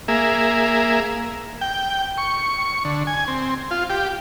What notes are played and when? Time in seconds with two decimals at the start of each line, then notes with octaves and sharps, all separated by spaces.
0.08 A#3 G#4 E5
1.61 G5
2.18 C#6
2.85 D3
3.07 G#5
3.28 C4
3.71 F4
3.90 G4